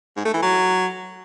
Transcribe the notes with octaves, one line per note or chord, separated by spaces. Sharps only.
G#2
A3
E3
F#3